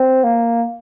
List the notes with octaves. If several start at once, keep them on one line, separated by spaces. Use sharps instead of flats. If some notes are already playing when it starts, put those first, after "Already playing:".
Already playing: C4
A#3